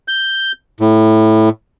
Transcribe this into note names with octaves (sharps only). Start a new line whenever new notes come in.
G6
A2